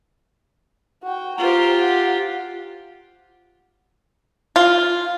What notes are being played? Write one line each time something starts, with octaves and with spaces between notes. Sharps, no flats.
F#4 G5
F4 G4 C5 A#5
F#5
F4